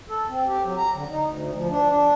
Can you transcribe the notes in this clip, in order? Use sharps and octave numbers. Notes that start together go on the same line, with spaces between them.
A4
C4
G4
F#3
A#5
D3
D#4
D2
F3
D4
D4